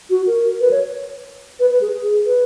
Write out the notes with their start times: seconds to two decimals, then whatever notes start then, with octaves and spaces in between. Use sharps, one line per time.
0.10 F#4
0.27 A#4
0.61 B4
0.71 C#5
1.60 B4
1.70 B4
1.81 G#4
1.92 G#4
2.26 B4